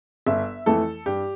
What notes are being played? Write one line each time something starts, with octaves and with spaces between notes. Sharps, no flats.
G1 E5
F2 E3 A3 A4
G2 G4